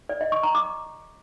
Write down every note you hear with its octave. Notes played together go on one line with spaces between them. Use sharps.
D5
D#5
C#6
A#5
D6